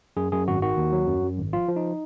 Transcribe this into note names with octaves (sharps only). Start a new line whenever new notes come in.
F#2 G#4
F#2 G#4
G#1 F#4
D#3 F#4
D#2
F#3
F#2
F#2
G#1
F3 F4
F3
D#4